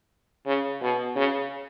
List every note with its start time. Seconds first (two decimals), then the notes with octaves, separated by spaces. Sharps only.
0.46 C#3
0.81 B2
1.16 C#3